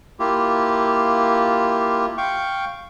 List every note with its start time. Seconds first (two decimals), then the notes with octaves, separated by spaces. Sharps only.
0.19 A#3 E4 F4 G4
2.17 F5 G5 C#6